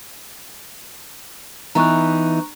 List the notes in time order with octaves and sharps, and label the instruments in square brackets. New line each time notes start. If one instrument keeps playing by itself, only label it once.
[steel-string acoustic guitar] E3 B3 D#4 [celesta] A#5 C#6 F#6